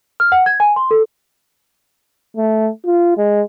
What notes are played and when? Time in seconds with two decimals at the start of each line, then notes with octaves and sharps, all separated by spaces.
0.20 F6
0.32 F#5
0.46 G#6
0.60 G#5
0.76 C6
0.91 A4
2.37 A3
2.86 F4
3.17 G#3